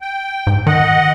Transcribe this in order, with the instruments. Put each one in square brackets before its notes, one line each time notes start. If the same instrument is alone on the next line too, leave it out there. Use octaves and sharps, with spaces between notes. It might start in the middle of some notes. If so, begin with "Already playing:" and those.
[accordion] G5
[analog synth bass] G#2
[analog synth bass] D#3 [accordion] D#5 F#5